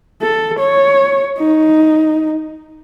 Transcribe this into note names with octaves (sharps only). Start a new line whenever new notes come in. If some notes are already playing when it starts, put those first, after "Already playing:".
A4
C#5
D#4